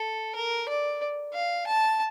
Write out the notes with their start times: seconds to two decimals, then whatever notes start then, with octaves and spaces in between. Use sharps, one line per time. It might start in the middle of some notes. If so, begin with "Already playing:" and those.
Already playing: A4
0.36 A#4
0.69 D5
1.34 F5
1.67 A5